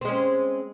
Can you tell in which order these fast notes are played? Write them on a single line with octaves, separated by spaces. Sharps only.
C4 G#3 C#4